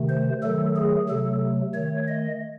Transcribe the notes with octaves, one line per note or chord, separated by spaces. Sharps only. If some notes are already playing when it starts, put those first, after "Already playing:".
Already playing: C3 D#3 A3
C5
D#3 F#3 A3 A4
G#4
C3 F#3 A3 A4
D#3 A3 C#5
D#5